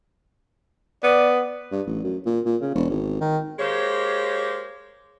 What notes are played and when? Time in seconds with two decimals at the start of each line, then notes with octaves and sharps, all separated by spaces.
1.03 B3 D5
1.72 G2
1.87 A1
2.04 F#2
2.26 A#2
2.46 A#2
2.62 C#3
2.75 E1
2.90 G#1
3.21 D#3
3.59 G#3 A#3 G4 C5 C#5